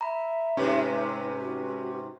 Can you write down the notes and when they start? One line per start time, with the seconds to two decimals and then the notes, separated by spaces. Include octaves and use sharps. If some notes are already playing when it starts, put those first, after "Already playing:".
0.01 E5 A#5 B5
0.57 G#2 C3 C#4 G4 B4
1.40 F#4